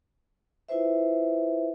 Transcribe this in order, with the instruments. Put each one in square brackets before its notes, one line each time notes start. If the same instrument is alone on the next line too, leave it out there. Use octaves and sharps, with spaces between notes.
[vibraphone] E4 F4 B4 C5 E5